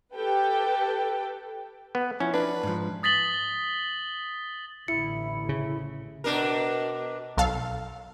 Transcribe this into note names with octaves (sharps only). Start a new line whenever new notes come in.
G4 A4 B4 G5
B3
F3 C#4 E4
D4 B4
G#2 F3
D#6 A6 B6 F#7 G7
A1 D3 E4 C#7
C#3
B2 D4 A#4
B1 A4 F5